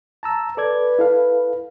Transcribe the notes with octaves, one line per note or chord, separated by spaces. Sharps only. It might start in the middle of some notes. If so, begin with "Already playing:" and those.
A5 A#5 E6
A4 B4 D5 G#6
E4 A4 F5